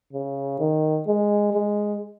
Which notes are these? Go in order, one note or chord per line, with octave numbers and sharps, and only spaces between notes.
C#3
D#3
G#3
G#3